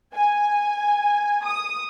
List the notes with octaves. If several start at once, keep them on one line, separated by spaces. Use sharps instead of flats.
G#5
D#6